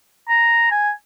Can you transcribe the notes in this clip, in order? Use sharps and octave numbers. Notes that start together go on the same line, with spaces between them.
A#5
G#5